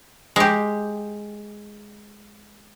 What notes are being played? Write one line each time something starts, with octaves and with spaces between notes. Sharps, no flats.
G#3 G4